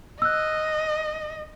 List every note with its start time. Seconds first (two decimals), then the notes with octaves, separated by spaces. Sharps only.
0.22 D#5 E6 F#6